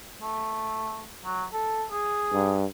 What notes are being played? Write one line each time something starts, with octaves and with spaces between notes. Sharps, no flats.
A3
F#3
A4
G#4
G2